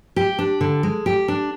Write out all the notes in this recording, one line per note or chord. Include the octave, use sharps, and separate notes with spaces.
G4
D4
D3
G#3
G4
D4